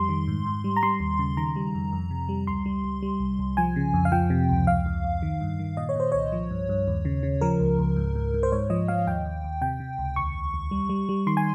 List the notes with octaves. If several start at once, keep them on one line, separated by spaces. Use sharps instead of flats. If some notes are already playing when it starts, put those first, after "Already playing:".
Already playing: F2 G3 C6
D#3
G#2
G#2
G3
A#5
G3 C6
D#2
C#3
D#3 A#5
G3
F2
F2
C3
G3
C#2 C6
G3
C#2
G3
C2
C2
F3 G#5
C#3
F2
F5
F3 G5
C3
C#2
F2 F5
F2
F2
D#3
G2
D#3
A#2 D#5
C#5
A#2 C5
C2 C#5
F3
G2
G2
D#2
C#3
C#3
F3 A#4
C#2
C#2
G#2
G#2
G#2
C5
G#2 C#5
F3 D#5
F3 F5
D#2 G5
D#2
D#2
C3 G5
C3
C#2
D#2 C#6
D#2
D#2
G3
G3
G3
D#3 C6
G#5